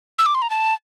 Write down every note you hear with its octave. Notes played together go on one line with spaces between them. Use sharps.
E6
D6
C6
A#5
A5